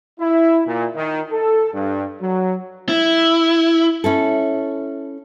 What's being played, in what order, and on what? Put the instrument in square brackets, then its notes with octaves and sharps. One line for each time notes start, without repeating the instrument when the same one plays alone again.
[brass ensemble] E4
A#2
D#3
A4
G2
F#3
[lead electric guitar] E4
[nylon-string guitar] C#4 E4 A4